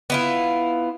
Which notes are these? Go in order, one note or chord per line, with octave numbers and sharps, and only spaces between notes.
B3 E4 F4